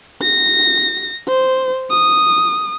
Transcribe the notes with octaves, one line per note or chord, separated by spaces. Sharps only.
A#6
C5
D#6